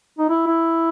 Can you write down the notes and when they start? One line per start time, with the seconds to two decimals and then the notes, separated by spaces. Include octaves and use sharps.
0.19 D#4
0.29 E4
0.47 E4